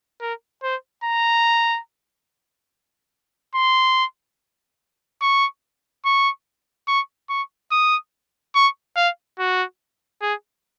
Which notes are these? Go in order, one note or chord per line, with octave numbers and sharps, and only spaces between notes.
A#4
C5
A#5
C6
C#6
C#6
C#6
C#6
D#6
C#6
F5
F#4
G#4